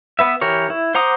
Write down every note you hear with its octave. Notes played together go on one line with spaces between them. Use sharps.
B3 B4 E5
E3 G4 A#4 C#5
E4
C5 F#5 A#5 D6 D#6